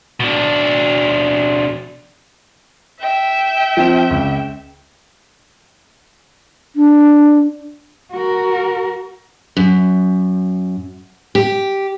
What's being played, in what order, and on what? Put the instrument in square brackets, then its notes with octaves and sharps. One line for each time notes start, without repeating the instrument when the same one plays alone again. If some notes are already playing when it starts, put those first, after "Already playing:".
[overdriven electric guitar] B2 D4
[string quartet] E5 G5
[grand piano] F3 C4 E7
C#2
[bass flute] D4
[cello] F#4 A#4
[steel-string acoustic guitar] F#2
G4